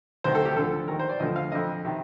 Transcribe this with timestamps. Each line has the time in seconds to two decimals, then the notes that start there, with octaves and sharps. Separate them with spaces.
0.24 D2 C3 D#3 C5
0.35 A4
0.45 G4
0.56 D2 D3 F3 A4
0.88 D#2 D#3 A#4
0.99 C5
1.09 D5
1.20 D2 D3 F3 D#5
1.36 F5
1.52 F2 D3 F3 D#5
1.85 C3 D#3